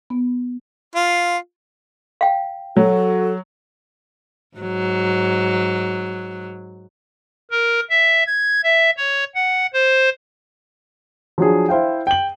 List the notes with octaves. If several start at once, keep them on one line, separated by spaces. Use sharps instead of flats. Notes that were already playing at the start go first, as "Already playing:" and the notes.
B3
F4
F5 G5
F#3 F#4 A4
G#2 F#3
A#4
E5
G#6
E5
C#5
F#5
C5
F3 F#3 D4 G#4
E4 C5 F5 G5
G5 F#7